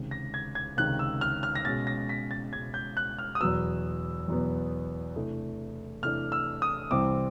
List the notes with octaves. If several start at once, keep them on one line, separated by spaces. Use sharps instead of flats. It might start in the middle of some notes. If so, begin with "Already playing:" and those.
Already playing: C#2 C3 D#3
A#6
G#6
G#6
C#2 C3 D#3 F#6
E6
F6
F6
A#6
B2 G#3 C#4 A6
A#6
B6
A6
B2 G#3 C#4 G#6
G6
F#6
F6
D#6
E2 B2 F#3 B3 E6
E2 B2 F#3 B3
C3 E3 A3 D4
C3 E3 A3 D4 F6
E6
D#6
C2 C3 E3 G3 C4 D6